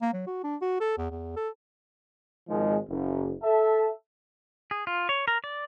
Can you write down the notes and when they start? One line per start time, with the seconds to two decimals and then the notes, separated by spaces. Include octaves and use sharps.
0.01 A#3
0.13 F#3
0.26 F#4
0.44 D4
0.62 F#4
0.80 A4
0.97 E2
1.10 E2
1.36 A4
2.49 G#1 G#2 D#3 F3 G#3
2.89 F#1
3.43 A4 E5 A5
4.71 G#4
4.87 F4
5.09 C#5
5.28 A#4
5.44 D5